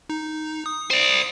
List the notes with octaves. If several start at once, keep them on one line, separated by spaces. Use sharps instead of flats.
D#4
D#6
C5 D5